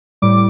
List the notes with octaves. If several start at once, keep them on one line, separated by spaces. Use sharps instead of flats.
A2 G3 D6